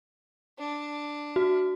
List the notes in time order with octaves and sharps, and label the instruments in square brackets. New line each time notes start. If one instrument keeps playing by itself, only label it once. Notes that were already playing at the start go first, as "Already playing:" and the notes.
[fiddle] D4
[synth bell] F#4